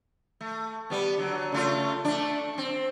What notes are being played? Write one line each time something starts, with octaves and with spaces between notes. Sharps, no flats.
A3
G3 B3
D3 F#3
C#3 A3 F4
A3 D4
C4